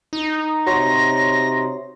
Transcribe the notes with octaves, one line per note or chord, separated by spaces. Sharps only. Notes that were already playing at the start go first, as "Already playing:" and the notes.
D#4
C3 F#4 C#5 C6 A#6